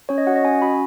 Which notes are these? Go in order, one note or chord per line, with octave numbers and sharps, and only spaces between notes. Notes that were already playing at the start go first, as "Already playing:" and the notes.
C#4 C#5
D#5
F#4 F#5
D#5
C#4 G#5
F#4 B5